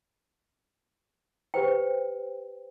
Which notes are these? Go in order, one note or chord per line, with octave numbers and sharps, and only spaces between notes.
G4 B4 C5 G5